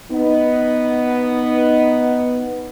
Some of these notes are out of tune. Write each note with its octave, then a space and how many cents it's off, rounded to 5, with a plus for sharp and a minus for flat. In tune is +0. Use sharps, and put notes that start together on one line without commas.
B3 +0 D#4 +0